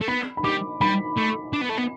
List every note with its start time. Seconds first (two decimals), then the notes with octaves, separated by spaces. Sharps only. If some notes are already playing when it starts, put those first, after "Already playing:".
0.01 A3
0.08 B3 B5
0.37 B5
0.44 G3 D6
0.81 G3 B5
1.17 A3
1.53 D4
1.62 B3
1.69 A3
1.78 B3